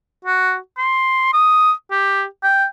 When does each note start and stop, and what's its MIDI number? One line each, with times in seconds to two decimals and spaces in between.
0.25 0.57 66
0.78 1.33 84
1.33 1.72 87
1.91 2.24 67
2.43 2.66 79